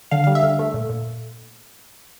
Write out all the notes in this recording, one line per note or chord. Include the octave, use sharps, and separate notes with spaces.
D3 F5
G3 F5
E5
D3
A3
A#2
A#2